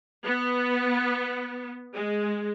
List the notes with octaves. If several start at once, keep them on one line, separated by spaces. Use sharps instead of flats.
B3
G#3